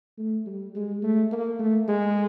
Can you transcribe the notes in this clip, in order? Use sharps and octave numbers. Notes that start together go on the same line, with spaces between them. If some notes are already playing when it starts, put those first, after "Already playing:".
A3
G3
G#3
A3
A#3
A3
G#3